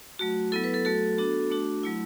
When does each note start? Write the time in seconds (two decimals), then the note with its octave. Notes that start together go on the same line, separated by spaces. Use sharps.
0.19 F#3 A3 F#4
0.52 F#3 B3 E4 A4
0.64 B4
0.74 A4
0.85 F#3 A3 F#4 A4
1.18 B3 D4 F#4
1.50 A3 D4 F#4
1.83 F#3 A3 E4